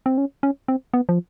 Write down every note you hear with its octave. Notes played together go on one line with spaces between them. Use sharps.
C4
C#4
C#4
C4
B3
F3